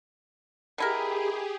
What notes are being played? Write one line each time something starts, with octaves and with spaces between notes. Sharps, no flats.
B2 E4 G4 G#4 A#4